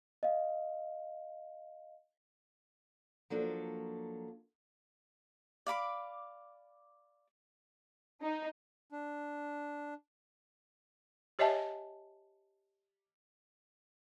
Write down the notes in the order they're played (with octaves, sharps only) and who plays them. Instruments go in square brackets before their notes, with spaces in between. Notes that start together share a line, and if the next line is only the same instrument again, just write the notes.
[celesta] D#5 F5
[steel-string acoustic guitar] F3 F#3 A#3 D4 A4
[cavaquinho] D5 F5 B5 D6
[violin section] D#4
[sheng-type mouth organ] D4
[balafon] G4 C#5 D#5 E5 G#5 A5